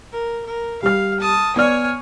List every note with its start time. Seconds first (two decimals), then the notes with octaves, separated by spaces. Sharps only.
0.12 A#4
0.46 A#4
0.83 G3 F5 F6
1.20 A5 D#6
1.56 B3 C#5 D5 G#5 F6